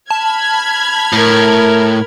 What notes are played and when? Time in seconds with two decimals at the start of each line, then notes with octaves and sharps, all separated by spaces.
0.11 A5 B5 F6 G#6
1.13 A2 A#4